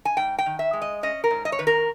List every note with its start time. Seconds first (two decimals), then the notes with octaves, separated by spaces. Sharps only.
0.05 G#5
0.17 G#2 G5
0.39 G5
0.46 D#3
0.59 E5
0.73 G#3
0.82 D#5
1.03 C#4 D#5
1.24 A#4
1.31 G#2
1.45 D#5
1.52 C#5
1.59 D#3 B4
1.67 A#4